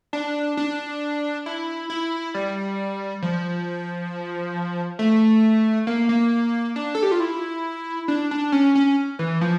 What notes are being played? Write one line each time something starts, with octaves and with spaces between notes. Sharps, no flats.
D4
D4
E4
E4
G3
F3
A3
A#3
A#3
D4
A4
G4
F4
E4
D4
D4
C#4
C#4
E3
F3